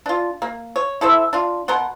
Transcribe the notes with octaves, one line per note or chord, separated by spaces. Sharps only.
D4 F4
A#3
C#5
E4 A4 C5 E5
D4 F4
B2 A#4 F#5 C6